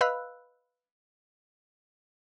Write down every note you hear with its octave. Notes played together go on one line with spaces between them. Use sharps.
B4 D#5 F5 B5 E6 F#6